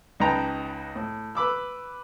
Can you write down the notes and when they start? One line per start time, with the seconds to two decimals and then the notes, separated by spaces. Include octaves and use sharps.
0.20 C#2 D#4 B4 G5 A5 A#5
0.96 A2
1.35 B4 B5 D6 E6